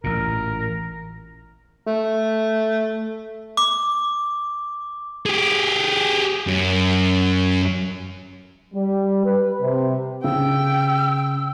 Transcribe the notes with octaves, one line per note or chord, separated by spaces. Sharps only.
A1 A#2 A#4
A3
D6
G4 G#4
F#2
G3
B4
C3
C#3 G5 E6